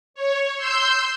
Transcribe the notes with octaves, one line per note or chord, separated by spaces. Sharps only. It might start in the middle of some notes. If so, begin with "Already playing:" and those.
C#5
C6 E6 G6